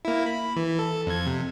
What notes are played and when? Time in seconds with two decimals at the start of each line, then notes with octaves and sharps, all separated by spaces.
0.05 A#3 E4
0.26 B5
0.56 E3
0.79 A4
1.07 F2 G#6
1.26 C3